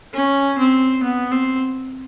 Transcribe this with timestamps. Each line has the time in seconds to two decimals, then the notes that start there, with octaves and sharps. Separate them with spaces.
0.13 C#4
0.58 C4
1.03 B3
1.31 C4